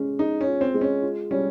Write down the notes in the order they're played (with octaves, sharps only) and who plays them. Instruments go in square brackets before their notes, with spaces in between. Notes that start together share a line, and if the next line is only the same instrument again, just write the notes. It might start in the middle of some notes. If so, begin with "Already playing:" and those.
Already playing: [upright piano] G#3 C#4
[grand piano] D#4 [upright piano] G#4
[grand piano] C#4
[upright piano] F4
[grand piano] C4
[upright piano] G#3
[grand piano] C#4
[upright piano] F4
[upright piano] G3 [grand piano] C#4